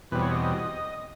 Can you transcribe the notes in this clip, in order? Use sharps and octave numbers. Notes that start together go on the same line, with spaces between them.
E2 B2 G3 C4 B4
C#5
D#5